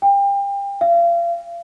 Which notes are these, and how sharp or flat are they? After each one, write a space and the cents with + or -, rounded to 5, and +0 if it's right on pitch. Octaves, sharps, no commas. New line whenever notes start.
G5 +30
F5 -35